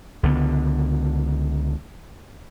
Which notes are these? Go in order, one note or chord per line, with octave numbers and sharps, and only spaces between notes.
C#2 D3 G3 B3